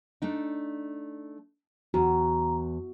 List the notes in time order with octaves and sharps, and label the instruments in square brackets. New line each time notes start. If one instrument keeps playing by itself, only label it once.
[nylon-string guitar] A3 D4 D#4
[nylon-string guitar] E2 [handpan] F#4 [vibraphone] A#5